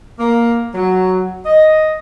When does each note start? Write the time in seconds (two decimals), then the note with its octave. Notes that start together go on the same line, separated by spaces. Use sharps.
0.19 A#3
0.74 F#3
1.46 D#5